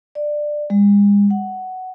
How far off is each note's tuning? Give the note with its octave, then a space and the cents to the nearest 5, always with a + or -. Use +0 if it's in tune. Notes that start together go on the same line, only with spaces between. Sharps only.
D5 +15
G#3 -40
F#5 +10